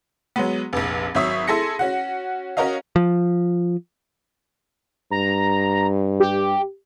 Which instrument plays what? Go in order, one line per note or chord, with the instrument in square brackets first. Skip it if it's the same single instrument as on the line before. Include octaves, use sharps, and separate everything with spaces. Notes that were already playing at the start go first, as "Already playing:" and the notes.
[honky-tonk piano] F#3 G#3 B3
F1 A#1
G#1 F#3 E5 C#6 D#6 B6
E4 G#4 A4 C6 A#6 C#7
C#4 F#4 F#5
C#4 F#4 A#4 C#5 D#5 F5
[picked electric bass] F3
[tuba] G2 [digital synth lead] A#5
[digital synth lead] G4